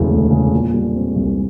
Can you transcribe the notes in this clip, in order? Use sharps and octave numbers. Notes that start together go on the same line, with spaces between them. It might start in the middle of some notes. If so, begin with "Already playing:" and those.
Already playing: E1 D2 C#3 E3
D2
C#3
A#2
G3
C4
C2